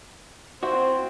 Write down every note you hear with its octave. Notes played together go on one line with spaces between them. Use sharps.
C4 E4 F#4 C5 E5 F#5